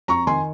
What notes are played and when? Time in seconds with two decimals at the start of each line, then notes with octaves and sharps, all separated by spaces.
0.08 F2 A#5 C#6
0.27 D#3 G#5 C6